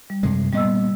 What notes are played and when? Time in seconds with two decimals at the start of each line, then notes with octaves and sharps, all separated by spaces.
0.10 G3
0.23 F#2 C3 G#3
0.53 A#2 G3 B3 D#5 E6